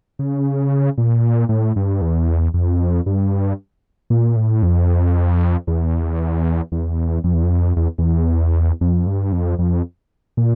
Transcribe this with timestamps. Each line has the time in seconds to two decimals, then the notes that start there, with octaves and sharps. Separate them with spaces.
0.19 C#3
0.98 A#2
1.49 A2
1.76 G2
2.02 E2
2.54 F2
3.06 G2
4.10 A#2
4.36 A2
4.63 F2
5.67 E2
6.72 E2
7.24 F2
7.34 E2
7.43 F2
7.76 E2
7.98 E2
8.81 F2
9.07 G2
9.32 F2
9.59 F2
10.37 A#2